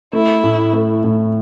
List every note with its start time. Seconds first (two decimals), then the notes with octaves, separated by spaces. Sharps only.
0.13 A3 E4
0.44 A2
0.73 A3
1.04 A2